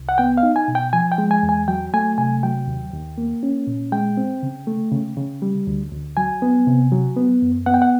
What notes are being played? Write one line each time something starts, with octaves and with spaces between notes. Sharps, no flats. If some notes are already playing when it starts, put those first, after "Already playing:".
Already playing: C2
F#5
B3 G5
F5
D#4
G#5
B2
G5
F3 G#5
G5
G#3
G#5
E2
G#5
F#3 G5
A3 G#5
C3 G#5
F#3 G5
D#2
D#2
A#3
C#4
A#2
G#3 G5
C4
C#3
A3
C#3
C#3
G3
D2
D2
F#3 G#5
B3
C3
F#3
B3
F#2
B3 F#5
G5
F#5